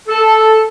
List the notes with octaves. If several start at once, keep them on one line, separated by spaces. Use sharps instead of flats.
A4